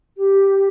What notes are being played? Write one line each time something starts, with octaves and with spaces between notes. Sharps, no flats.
G4